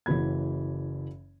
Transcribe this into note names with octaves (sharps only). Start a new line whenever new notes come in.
F#1 E3 F#3 B5 G#6